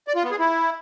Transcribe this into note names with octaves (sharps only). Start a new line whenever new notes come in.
D5
F4
B3
G#4
E4